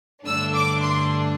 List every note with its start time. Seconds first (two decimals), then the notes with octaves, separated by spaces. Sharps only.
0.25 G2 D3 A3 D4 E6
0.54 D6
0.82 C6